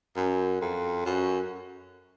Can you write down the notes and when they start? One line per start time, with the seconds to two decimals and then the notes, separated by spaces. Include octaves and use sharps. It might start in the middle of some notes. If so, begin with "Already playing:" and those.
0.16 F#2
0.61 F2
1.05 F#2